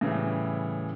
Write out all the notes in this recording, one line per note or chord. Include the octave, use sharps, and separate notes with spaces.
A2 C#3 E3 G3